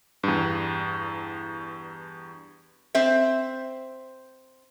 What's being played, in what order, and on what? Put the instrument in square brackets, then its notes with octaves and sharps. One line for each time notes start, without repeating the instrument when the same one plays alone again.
[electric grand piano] E2 G2
[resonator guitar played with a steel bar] C4 C5 E5